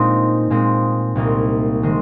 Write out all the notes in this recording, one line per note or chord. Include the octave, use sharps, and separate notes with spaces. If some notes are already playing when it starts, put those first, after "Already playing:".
Already playing: A#2 G#3 C4 D#4
A#2 G#3 C4
C2 A#2 A#3 D#4
D#3 G#3 C4